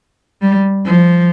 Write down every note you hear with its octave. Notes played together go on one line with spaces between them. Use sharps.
G3
F3